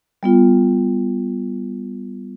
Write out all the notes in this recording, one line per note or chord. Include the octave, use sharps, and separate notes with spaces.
G3 B3 F4